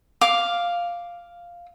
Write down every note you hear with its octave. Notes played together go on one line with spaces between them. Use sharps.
F5 D6